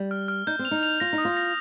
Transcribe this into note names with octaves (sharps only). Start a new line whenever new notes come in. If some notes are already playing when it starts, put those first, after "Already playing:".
Already playing: G3
F6
F6
D#4 G6
C4
F7
D#4
F7
F4 A#6
D#4
D#6
F4
A#6